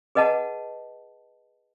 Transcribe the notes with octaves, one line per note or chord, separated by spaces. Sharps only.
G#4 B4 D#5 F#5 A5